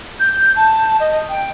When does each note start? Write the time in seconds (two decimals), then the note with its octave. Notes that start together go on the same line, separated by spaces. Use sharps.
0.20 G6
0.56 A5
1.00 D#5
1.29 G5